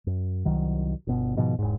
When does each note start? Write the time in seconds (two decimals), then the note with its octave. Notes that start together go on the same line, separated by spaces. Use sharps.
0.07 F#2
0.45 C2 D#3 F#3
1.07 G1 B2
1.37 G#2 B2 D#3 F3
1.59 E1 G#2